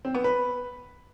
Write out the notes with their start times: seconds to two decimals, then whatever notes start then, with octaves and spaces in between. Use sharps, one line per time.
0.05 C4
0.14 B3
0.24 B4